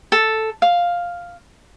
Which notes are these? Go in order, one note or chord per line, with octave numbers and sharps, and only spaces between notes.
A4
F5